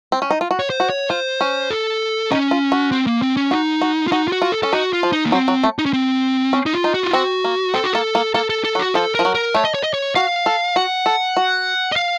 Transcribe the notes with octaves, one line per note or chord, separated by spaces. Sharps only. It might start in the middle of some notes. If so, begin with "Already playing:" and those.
C4
C#4
D#4
F4
F#4
C#5
C5
F#4
C#5
F4 C5
C#4
A4
C#4 D#4
F4
F#4
C4
A#3
C4
C#4
D#4 F#4
F#4
F4
D#4 F#4
F4
F#4
F4
A4
C#4 A4
D#4 F#4
F4
F3
D#4
A#3
F#3 C4
F#3
A3
D#4
C#4
C4
C#4
D#4
F4
D#4
F#4
F4
C4 F#4
A#3
C4 A4
F#4
A#3 A4
A#3
A#3 A4
A4
A4
F#3
F#4
F3 A4
F3 A#4
F#3
A#4
A3 C#5
D#5
C#5
D#5
C#5
F#4 F5
A4
F#4 F#5
A4
F#4
D#5
F5